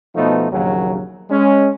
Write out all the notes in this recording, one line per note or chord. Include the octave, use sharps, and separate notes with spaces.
B2 F3 A3 B3 D#4
A#1 D#2 C#3 F#3
G#3 C#4